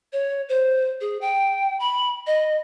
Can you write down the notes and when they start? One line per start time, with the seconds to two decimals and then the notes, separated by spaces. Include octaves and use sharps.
0.13 C#5
0.49 C5
1.01 G#4
1.21 G5
1.80 B5
2.27 D#5